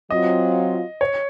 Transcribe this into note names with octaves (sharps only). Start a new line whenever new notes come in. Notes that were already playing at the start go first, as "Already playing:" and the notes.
F#3 C4 F4 D#5
C#5